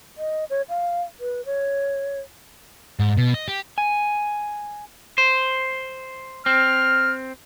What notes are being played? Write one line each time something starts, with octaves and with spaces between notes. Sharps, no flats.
D#5
C#5
F5
B4
C#5
G#2
B2
D#5
G4
G#5
C5
C4 F6